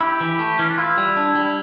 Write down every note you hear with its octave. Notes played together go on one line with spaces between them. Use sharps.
E4 G4
E3
A3
E3 C#4
D4
E4 F4
G3
D4
G3
E4